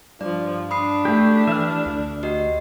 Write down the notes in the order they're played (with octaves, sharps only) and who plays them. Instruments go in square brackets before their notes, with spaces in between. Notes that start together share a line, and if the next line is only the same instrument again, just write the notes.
[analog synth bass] G2 [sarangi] F3 [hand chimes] D5
[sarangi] D4 [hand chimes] B5 D#6 C7
[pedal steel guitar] A3 G4
[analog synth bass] E3 [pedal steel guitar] E5 F6
[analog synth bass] D2
[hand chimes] F#4 G4 D#5